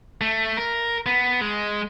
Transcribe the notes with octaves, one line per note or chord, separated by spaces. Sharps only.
A3
A#4
B3
G#3